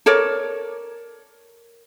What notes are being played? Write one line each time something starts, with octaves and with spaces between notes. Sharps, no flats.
A4 A#4 C#5 D5